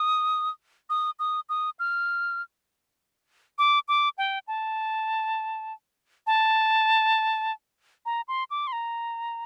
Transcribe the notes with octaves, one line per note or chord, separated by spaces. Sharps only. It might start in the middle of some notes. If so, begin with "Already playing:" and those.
Already playing: D#6
D#6
D#6
D#6
F6
D6
D6
G5
A5
A5
A#5
C6
D6
C6
A#5